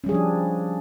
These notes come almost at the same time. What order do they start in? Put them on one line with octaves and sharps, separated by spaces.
C#4 G3 G#4 F3 D4